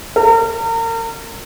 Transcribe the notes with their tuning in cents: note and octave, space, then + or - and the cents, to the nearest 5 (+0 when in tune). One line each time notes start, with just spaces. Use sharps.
A#4 -35